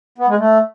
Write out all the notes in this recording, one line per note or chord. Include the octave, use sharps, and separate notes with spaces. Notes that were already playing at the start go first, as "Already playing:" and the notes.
B3
G#3
A3